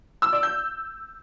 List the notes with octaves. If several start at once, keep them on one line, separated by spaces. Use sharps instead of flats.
E6
D5
G6